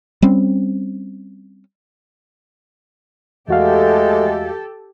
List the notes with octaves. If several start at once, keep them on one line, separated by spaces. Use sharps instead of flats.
G3 C4 C#4
E2 G#3 A3 F#4 G4 A4 F5